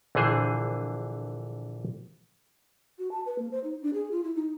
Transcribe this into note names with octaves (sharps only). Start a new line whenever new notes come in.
A#1 D3 E3 G#4 C5 G#5
F#4
A5
B4
A#3
C5
D#4
D4
G#4
F4
E4
D#4